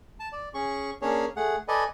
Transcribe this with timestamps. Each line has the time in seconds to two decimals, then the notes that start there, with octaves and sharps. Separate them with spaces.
0.20 A5
0.32 D5
0.54 C#4 G#4 C#6
1.02 A#3 C#4 D4 G#4 C#5
1.36 A3 G#4 F#5
1.68 A4 B4 D5 D#5 G#5